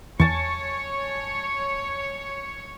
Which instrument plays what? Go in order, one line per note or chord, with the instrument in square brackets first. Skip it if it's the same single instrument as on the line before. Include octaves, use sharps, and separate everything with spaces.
[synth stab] E2 [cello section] C#5 [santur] G#5 A5 C#6